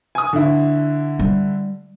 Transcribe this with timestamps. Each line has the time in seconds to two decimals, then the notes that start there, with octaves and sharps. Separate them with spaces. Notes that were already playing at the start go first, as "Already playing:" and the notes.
0.15 G#5 D#6
0.33 D3 E4
1.19 G3